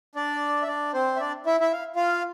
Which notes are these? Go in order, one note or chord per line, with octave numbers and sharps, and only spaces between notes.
D4 D5
E5
D4 D5
C4 C5
E5
D4 D5
E4 E5
E4 E5
F5
F4 F5